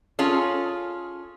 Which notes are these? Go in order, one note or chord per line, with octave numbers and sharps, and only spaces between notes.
C#4 F4 G#4 A4